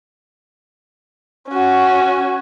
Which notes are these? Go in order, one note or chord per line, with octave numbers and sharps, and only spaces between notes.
C#4 F#4